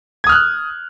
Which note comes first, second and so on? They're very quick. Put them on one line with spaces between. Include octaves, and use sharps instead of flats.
G#6 D#6 F6 F#6